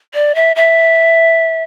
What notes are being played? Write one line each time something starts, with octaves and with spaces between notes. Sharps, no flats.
D5
E5
E5